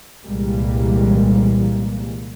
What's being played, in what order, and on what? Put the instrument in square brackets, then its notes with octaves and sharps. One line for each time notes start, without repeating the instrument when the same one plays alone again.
[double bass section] C2 A#2 E3 G3 G#3 A#3